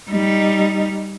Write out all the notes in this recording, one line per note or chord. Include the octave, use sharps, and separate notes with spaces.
G3 D#4